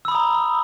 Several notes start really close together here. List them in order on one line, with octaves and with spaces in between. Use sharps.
E6 B5 D#6 A#5